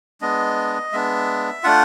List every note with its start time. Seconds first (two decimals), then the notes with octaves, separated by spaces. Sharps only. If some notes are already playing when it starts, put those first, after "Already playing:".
0.21 G#3 B3 D4 D#5
0.92 G#3 B3 D4 E5
1.64 A3 D4 F4 F#5